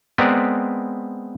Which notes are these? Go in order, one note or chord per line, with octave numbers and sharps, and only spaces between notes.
G#3 B3 C4 A#4 B4 D5